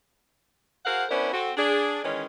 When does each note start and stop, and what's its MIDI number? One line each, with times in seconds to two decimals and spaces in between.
0.85 1.05 66
0.85 1.05 68
0.85 1.05 70
0.85 1.05 72
0.85 1.05 77
0.85 1.05 78
1.09 1.31 59
1.09 1.31 61
1.09 1.31 62
1.09 1.31 64
1.09 1.31 70
1.09 1.31 72
1.33 1.51 60
1.33 1.51 66
1.33 1.51 69
1.57 2.03 62
1.57 2.03 68
2.04 2.23 51
2.04 2.23 52
2.04 2.23 56
2.04 2.23 61